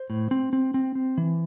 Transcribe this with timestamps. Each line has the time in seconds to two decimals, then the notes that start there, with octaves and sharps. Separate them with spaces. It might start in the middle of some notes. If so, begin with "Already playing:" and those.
Already playing: C5
0.10 A2
0.31 C4
0.53 C4
0.74 C4
0.95 C4
1.18 E3